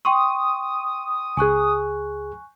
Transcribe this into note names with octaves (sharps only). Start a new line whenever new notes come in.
G5 C6 C#6 D#6
C#2 G#4 G#5 C#6 F#6